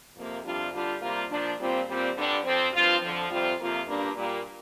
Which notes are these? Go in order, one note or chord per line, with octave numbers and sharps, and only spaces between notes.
F2 C3 A#3
F2 C3 G3 D4 F4
D3 G3 D4 F4
C3 G3 A#3 F4
A#2 F3 D4
A#2 G3 C4 F4
A#2 G3 C4 F4
G2 D3 G3 D4
F2 F3 C4
G2 F3 C4 F4
F2 D3 F3
F2 C3 G3 C4 F4
F2 C3 A#3 F4
G2 G3 A#3 D4
A#2 G3 A#3